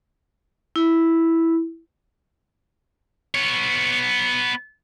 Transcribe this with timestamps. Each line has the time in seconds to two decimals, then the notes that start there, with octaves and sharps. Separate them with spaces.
0.76 E4
3.35 B3 C#5